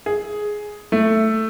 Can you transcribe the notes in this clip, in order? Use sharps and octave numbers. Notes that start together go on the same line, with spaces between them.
G#4
A3